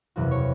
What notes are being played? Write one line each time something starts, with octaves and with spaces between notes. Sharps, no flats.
F#1 E2 C3 E3 F#4
C#5